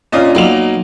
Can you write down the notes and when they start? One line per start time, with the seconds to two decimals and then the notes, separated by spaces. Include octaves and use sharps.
0.12 A#2 C#4 D4 F4 D#5 D#6
0.35 B1 A#3 F7